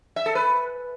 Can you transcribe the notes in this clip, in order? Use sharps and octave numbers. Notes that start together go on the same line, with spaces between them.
E5
A4
B4